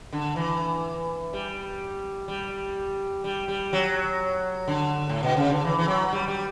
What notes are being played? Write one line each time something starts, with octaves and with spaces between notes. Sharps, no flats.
D3
E3
G3
G3
G3
G3
F#3
D3
A2
B2
C#3
D3
E3
E3
F#3
G3
G3